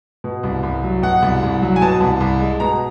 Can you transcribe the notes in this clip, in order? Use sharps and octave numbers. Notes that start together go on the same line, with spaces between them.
B2
C2
C2
F#3
B2 F#5
C2
C2
F#3
G#5
B2 A5
C2
C2
G#3
B2 A#5